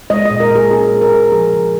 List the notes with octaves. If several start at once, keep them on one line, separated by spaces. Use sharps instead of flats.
G#3 D#5
D#5
A#2
A#4
A#2 G#4
C#4 G#4
G#3
A#4
A#2
F3 G#4
C#3